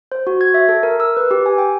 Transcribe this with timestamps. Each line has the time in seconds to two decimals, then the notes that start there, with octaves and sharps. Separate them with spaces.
0.12 C5
0.27 F#4
0.41 G#6
0.54 E5
0.69 A4
0.83 A#4
1.00 E6
1.17 B4
1.31 G4
1.46 G#5
1.58 G5